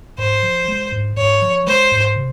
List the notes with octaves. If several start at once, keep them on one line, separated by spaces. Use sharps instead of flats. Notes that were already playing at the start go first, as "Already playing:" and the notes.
G#2 C5
F3
G#3
G#2
G#2 C#5
F3
G#3 C5
G#2
C3